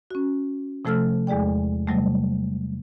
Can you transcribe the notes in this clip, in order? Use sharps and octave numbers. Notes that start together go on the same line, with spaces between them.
C#4 F#4
C3 F3 A3 A4 E6 F6
E2 G#3 G#4 D5 G5
C3 F#3 G3 A3